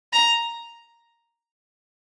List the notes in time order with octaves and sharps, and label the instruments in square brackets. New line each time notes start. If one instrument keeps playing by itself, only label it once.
[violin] A#5